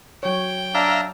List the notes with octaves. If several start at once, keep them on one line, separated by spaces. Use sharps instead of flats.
F#3 C#5 G5
D4 E5 F5 A#5